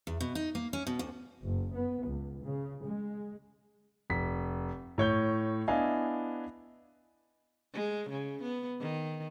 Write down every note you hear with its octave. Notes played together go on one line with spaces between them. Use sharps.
E2
B2
D#4
A#3
C#4
B2
D2
F#1
B3
C#2
C#3
G#3
F1 B6
A2 C#5 G6 G7
B3 D4 E4 D#5 F5 G#5
G#3
C#3
B3
D#3